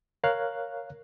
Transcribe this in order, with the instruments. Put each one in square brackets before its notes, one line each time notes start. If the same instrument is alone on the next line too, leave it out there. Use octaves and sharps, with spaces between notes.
[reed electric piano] A#4 C#5 F5 F#6